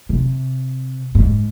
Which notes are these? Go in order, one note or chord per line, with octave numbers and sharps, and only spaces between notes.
C3
G#2